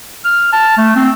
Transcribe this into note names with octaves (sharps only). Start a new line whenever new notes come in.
F6
A5
A3
C4